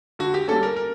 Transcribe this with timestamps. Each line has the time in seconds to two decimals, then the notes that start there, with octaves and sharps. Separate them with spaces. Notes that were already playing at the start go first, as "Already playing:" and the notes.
0.19 D3 F#4
0.34 G4
0.48 G3 A#3 C#4 A4
0.63 A#4
0.76 A#4